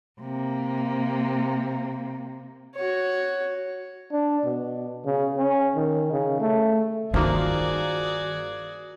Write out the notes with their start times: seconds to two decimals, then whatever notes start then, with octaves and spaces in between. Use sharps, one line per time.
0.20 C3 A#3
2.75 F#4 C#5
4.12 D4
4.45 B2
5.05 C#3
5.38 C#4
5.76 D#3
6.12 C#3
6.40 A3
7.14 G2 D#3 F3 A#3 D#4 F#4 G#4 D5